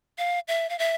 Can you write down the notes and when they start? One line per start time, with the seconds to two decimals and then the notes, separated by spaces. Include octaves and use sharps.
0.18 F5
0.48 E5
0.70 F5
0.79 E5